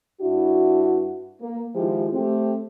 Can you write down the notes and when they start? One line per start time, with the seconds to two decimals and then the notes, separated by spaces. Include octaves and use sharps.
0.21 G2 D4 E4 F#4
1.41 A#3
1.75 D#3 F3 G#3 E4 F4 G4
2.13 A3 C4 G4